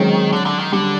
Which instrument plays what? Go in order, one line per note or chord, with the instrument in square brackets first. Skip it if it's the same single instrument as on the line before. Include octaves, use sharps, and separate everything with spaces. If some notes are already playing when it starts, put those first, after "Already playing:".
Already playing: [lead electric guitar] D#3 [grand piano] F#3 G#3 C4 C#4
[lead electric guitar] D3
D3
D#3
[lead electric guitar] D3 [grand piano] G3